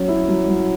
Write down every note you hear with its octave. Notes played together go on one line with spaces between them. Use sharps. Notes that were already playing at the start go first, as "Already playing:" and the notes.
Already playing: F#3 C#4
E4
F#3
F#3